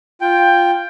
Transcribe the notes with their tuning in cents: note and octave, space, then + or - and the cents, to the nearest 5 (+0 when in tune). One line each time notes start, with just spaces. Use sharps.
F4 +0 G5 +10